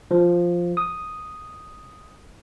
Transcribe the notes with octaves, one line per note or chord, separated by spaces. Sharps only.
F3
D#6